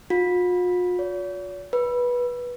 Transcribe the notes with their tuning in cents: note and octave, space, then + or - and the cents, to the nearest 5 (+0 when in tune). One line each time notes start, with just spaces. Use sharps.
F4 +45
C#5 +45
B4 -15